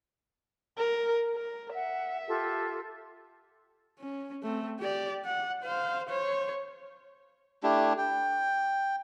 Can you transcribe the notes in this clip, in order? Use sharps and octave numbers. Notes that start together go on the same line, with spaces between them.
A#4
A#4
E5 F#5
F4 G4 A4
C#4
A3 C4
G4 D5
F#5
C5 F5
C5 C#5
A3 D4 E4 G4
G5